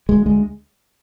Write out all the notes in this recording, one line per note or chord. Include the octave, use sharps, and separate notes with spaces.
D2 G#3
D2 G#3